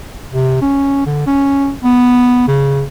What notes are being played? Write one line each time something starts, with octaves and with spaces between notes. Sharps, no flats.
C3
C#4
D3
C#4
B3
C#3